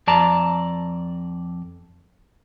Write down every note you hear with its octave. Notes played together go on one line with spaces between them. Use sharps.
F2 D5 A5 A#5